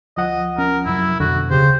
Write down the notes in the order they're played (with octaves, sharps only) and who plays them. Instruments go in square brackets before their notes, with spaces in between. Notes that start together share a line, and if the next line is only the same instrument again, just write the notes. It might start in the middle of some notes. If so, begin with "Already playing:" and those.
[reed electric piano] D2 F3 F#5 [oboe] D#5
[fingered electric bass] C#4 [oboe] A#4
[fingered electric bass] F#2 C3 F#3 [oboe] E4
[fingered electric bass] F2 B2 [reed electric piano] D3 [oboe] F#4
[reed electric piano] D2 G4 G6 [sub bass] C#3 [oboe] C5